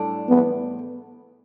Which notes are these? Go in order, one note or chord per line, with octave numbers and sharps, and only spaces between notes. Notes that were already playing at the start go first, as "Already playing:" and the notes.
Already playing: A2 G3 D4 A4
B3